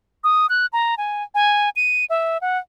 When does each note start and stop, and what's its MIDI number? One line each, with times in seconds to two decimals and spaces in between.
0.24 0.46 87
0.49 0.66 90
0.73 0.95 82
0.98 1.23 80
1.35 1.69 80
1.76 2.05 99
2.10 2.38 76
2.41 2.58 78